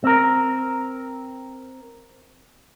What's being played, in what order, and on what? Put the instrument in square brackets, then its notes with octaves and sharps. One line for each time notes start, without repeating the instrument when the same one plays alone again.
[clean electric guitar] C4 A#4